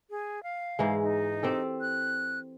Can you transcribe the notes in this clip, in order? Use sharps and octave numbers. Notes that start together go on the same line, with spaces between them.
G#4
F5
G#2 E3 G#3
D#4
C4 G4 A4
F#6